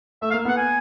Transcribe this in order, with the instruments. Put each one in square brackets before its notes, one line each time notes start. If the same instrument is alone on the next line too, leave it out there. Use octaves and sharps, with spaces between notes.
[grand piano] A3 [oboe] E5
[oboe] F5
[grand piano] A#3
[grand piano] B3 [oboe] F#5
[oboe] G#5